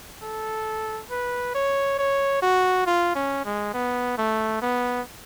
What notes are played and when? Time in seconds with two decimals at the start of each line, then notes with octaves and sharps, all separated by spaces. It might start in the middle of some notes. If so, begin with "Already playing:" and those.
0.23 A4
1.11 B4
1.55 C#5
1.99 C#5
2.43 F#4
2.86 F4
3.16 C#4
3.45 G#3
3.74 B3
4.18 A3
4.62 B3